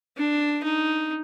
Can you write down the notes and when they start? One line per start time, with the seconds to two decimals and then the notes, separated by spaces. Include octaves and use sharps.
0.17 D4
0.63 D#4